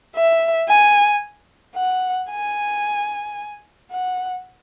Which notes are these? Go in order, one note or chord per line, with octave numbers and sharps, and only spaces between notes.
E5
G#5
F#5
G#5
F#5